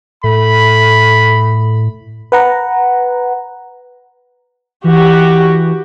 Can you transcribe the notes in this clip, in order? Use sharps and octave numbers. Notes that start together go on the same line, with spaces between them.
A2 A3 B5
B4 F#5 A#5
E3 F#4 G4